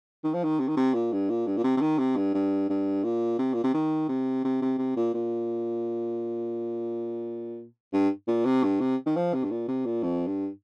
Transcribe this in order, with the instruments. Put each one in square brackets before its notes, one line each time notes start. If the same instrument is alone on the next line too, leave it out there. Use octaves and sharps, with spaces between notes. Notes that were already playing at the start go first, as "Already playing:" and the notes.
[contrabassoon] D#3
F3
D#3
C3
D#3
C3
A#2
G2
A#2
G2
A#2
C3
C3
D#3
C3
G2
G2
G2
A#2
C3
A#2
C3
D#3
C3
C3
C3
C3
A#2
A#2
G2
A#2
C3
G2
C3
D#3
F3
C3
G2
A#2
C3
A#2
F2
G2